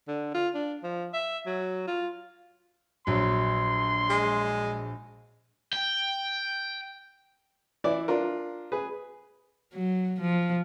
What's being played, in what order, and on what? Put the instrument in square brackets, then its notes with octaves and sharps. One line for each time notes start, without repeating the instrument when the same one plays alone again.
[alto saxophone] D3
F4
D4
F3
E5
F#3
F4
[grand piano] A#1 F#3 [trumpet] C6
[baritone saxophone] G#3
[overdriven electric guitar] G5
[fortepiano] E3 E4 D5
D4 F4 A#4
G#4 B4
[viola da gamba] F#3
F3